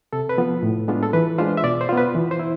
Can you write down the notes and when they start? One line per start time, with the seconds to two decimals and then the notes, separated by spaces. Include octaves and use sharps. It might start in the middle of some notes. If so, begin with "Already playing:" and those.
0.13 C3 A4
0.29 B4
0.38 F3 B3 F4
0.63 A2
0.88 G#3 B3 D4 F4
1.03 A4
1.13 E3 B4
1.38 G#3 D4 F4 C5
1.57 E5
1.63 B2 D5
1.81 C5
1.89 B3 F4
1.97 B4
2.15 E3
2.31 C5
2.39 E4